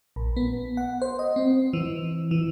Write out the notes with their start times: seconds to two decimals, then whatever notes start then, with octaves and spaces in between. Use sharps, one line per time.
0.16 A#1
0.36 B3
0.77 F#5
1.02 C5
1.19 D#5
1.36 C4
1.73 E3
2.31 E3